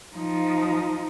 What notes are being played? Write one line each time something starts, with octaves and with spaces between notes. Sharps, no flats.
F3 D#4